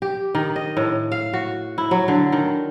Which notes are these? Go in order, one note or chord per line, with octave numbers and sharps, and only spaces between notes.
G4
D#3
D#5
A2
F5
F#4
E4
F#3
D3
D#3